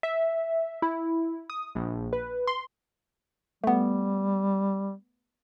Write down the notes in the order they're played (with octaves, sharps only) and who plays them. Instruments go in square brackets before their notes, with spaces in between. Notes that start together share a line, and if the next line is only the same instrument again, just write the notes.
[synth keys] E5
E4
D#6
A#1
B4
C6
[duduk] G3 [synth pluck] A3 B3